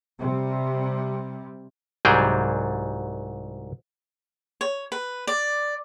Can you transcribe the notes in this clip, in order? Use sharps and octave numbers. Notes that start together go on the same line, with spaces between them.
C3 G3
C2 G#2 F#3 G3 G#4 G5
C#5
B4
D5